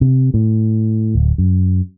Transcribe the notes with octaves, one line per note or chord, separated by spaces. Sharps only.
C3
A2
D1
F#2